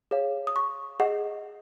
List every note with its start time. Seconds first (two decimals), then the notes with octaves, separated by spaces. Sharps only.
0.11 G#4 C#5 F5
0.47 D#6
0.56 C#6
1.00 G#4 D#5 F#5